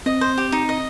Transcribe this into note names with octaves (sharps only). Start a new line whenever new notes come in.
C4 D#5
C5
G4
D#4
D#5